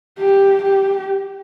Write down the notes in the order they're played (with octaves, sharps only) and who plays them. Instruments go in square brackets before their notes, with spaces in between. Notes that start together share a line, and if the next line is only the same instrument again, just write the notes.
[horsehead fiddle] G4
G4